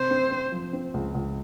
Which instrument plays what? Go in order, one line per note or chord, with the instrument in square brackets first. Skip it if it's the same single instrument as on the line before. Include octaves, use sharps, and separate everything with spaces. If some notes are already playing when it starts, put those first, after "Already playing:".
Already playing: [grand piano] C3 [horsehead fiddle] C5
[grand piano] C4
C4
F3
C4
C#2
C#2